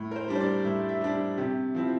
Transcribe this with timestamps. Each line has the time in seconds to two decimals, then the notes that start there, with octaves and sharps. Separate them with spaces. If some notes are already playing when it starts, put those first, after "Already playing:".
Already playing: A2
0.11 A#4
0.16 C5
0.28 G3 D4
0.35 C5
0.41 D5
0.65 A2 E5
0.89 E5
1.01 G3 D4
1.38 C3 G4
1.75 F3 C4 E4